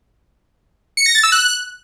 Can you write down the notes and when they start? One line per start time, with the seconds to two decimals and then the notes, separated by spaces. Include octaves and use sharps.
0.97 C#7
1.06 A#6
1.15 A6
1.23 E6
1.32 F#6